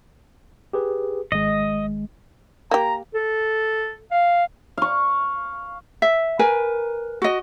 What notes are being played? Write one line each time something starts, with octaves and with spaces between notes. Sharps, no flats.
G4 G#4 B4
G#1 G#3 D#5
A#3 G4 A#5
A4
F5
F5 C#6
E5
A#4 B4 G#5
F#4 D#5